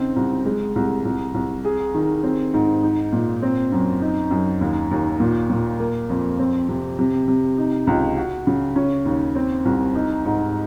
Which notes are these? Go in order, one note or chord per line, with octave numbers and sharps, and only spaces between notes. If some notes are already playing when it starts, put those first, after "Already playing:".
Already playing: C#3 C4 D#4
C2
G#3
C2
C2
C2
G#4
D#3
C4
G#2
D#4
A#2
C4
F#2
D#4
F#2
D#2
D#2
A#2
A#2
A#3
F2
C4
C3
C3
C3
D#4
C#2
F#4
C#3
C#4
D#2
C4
C2
D#4
G#2